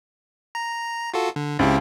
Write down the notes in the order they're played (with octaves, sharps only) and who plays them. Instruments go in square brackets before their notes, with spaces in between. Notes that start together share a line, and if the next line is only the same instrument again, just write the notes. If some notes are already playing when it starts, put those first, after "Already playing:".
[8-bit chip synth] A#5
F4 F#4 A4
D3
[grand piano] C#2 [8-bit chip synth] C4 E4 G4